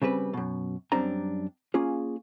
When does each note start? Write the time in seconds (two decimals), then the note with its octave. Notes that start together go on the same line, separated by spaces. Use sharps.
0.02 C#3 G3 C4 B4
0.33 F#2 B2
0.92 F#2 G3 C4 D4 A#5
1.74 A#3 C#4 F4 G#4